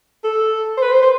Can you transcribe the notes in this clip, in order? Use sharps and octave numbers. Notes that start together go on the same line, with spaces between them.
A4
C5
B4
C5
C5